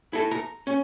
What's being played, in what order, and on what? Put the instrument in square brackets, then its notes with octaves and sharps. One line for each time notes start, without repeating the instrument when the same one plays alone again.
[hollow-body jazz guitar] E4 A4
A#5
C#4